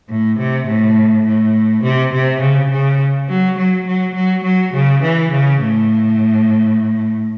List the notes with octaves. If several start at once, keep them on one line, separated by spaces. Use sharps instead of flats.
A2
C3
A2
A2
C3
C3
C#3
C#3
F#3
F#3
F#3
F#3
F#3
C#3
E3
C#3
A2